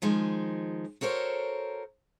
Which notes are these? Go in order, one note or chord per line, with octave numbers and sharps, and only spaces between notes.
D#3 F3 G#3
F#4 A4 A#4 C5 C#5